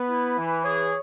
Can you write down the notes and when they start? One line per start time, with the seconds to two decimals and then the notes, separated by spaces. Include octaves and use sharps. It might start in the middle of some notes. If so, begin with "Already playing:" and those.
Already playing: B3 B4
0.09 E4
0.37 E3
0.65 G#4 C#5